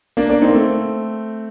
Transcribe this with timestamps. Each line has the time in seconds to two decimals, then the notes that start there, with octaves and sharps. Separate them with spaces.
0.17 A#3 D4
0.29 A#3 D4
0.42 C4 D#4
0.49 A#3
0.54 A3 C4